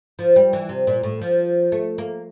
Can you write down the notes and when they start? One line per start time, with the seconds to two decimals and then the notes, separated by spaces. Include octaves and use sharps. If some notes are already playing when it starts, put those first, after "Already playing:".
0.19 F3
0.36 G3
0.53 E3
0.69 C3
0.87 A#2
1.04 A2
1.22 F3
1.72 A3
1.98 A#3